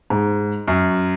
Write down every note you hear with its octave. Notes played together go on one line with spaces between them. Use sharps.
G#2
F#2